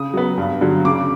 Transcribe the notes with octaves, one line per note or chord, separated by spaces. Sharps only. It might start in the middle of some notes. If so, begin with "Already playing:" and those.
Already playing: C#3 D#6
F#3 B3
G2
D3 F#3
C#3 D6